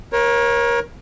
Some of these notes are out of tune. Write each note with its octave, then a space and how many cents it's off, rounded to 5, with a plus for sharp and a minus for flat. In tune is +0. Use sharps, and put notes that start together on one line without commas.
A#4 +25 C#5 -20